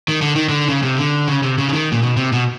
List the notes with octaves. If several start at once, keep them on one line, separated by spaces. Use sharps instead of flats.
D#3
D3
D#3
D3
C#3
C3
D3
C#3
C3
C#3
D3
D#3
A#2
B2
C3
B2